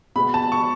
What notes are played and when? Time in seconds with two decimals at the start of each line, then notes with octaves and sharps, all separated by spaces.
0.15 B2 G#3 B3 B5
0.34 A5
0.52 C#6